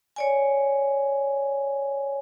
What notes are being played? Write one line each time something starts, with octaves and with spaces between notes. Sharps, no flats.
C#5 D5 G#5